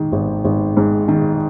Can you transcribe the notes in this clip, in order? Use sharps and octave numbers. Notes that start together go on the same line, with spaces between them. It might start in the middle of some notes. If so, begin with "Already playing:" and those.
Already playing: G#2 D#3
G#1
G#1
G#2
D#3